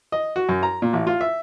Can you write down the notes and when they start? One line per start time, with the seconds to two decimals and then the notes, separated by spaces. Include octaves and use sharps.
0.12 D#5
0.36 F#4
0.49 F#2
0.63 A#5
0.82 A#2
0.93 A1
1.07 F4
1.21 E5